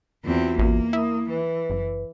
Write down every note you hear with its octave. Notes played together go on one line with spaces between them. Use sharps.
E2 C4 F4 F#4
A1 A#3
E4 A#4 D#6
E3 B4
F#1